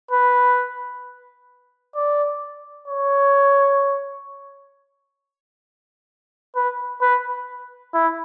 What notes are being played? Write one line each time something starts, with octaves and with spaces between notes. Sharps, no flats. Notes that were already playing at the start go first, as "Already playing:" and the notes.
B4
D5
C#5
B4
B4
E4